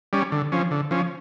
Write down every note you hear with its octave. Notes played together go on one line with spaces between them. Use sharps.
G3 C#4
D3
F3 C#4
D3
F3 C#4